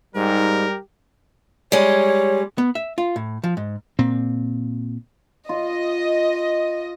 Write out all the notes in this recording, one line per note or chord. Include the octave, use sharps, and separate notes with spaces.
G#2 G3 D#4 G4 A#4
G3 G#3 C#5
B3
E5
F4
A2
F3
G#2
A#2 C4
F4 D#5